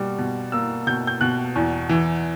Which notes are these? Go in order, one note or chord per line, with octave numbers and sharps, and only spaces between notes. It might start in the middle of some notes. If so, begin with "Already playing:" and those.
Already playing: B2 G3 A#3 D6
B2
A#3 E6
B2 G6
G6
B2 F#6
E2
E3